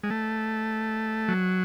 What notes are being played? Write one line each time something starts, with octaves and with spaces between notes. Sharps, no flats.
G#3
A3
F#3